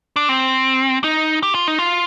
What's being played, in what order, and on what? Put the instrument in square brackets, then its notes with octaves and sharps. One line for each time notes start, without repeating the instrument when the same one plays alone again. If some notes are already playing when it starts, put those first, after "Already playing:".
[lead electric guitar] D4
C4
D#4
G4
F4
D#4
F4